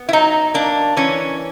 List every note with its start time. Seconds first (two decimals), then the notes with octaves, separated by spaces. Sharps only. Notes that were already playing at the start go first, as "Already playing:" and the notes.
Already playing: B3
0.09 E4
0.13 F#3 D#4
0.54 A#3 D4
0.97 E3 C#4